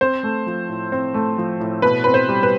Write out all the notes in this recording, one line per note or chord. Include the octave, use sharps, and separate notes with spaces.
C4 C5
A3
F3
A2
C4
A3
F3
A2
B2 B4
C4 B4
C5
G3
B4